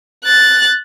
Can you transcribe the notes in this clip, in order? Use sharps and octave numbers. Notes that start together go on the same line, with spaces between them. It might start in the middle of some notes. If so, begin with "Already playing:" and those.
F#6 A6